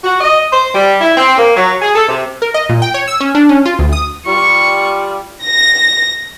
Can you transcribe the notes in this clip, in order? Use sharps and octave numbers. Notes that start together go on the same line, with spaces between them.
F#4
D#5
C5
G3
E4
C4
A#3
F#3
G#4
A4
C3
A#4
D#5
A#2
G5
C#5
E6
C#4
D4
C#4
F4
D2
D#6
G3 F4 C#6
A#6